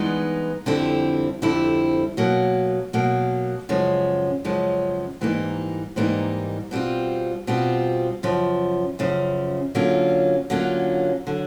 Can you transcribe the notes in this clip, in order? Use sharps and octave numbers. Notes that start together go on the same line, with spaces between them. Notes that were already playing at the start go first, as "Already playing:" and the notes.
Already playing: G2 E3 G#3 B3 D#4
F2 D3 G3 C4 E4
F2 D3 G3 C4 E4
B2 F#3 A#3
B2 F#3 A#3
F#2 C#3 F3 G#3
F#2 C#3 F3 G#3
G#2 E3 G3 A#3 D#4
G#2 E3 G3 A#3 D#4
B2 G3 C4 F4
B2 G3 C4 F4
F#2 C#3 F3
F#2 C#3 F3
D3 F#3 A#3 C#4 F4
D3 F#3 A#3 C#4 F4
D3 F#3